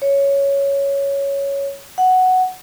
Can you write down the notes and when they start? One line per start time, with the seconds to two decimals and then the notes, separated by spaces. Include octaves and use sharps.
0.02 C#5
1.98 F#5